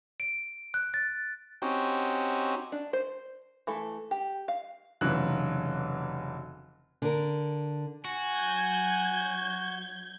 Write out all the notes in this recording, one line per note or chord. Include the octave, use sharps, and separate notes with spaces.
D7
F#6
A6
C4 C#4 D#4 F#4 G4
D4
C5
E3 A3 A4
G4
F5
F1 C#3 E3 F#3 F#6
D3 A#4
F#4 G#5
F#3 G6 G#6